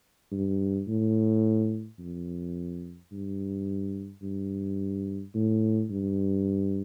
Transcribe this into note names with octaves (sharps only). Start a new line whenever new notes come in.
G2
A2
F2
G2
G2
A2
G2